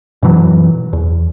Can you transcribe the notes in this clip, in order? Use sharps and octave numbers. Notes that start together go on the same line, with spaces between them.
F#2 B2 E3 F#3
E2